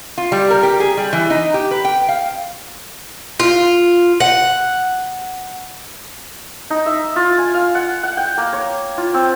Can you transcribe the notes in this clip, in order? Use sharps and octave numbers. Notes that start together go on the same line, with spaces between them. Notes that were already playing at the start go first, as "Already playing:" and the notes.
F4
G3
A#4
G4
G#4
G3
E3
D#4
G4
B4
G5
F5
F4
F#5
D#4
E5
F4
G#5
F5
F#5
F#5
G5
A#3
C#5
F4
C4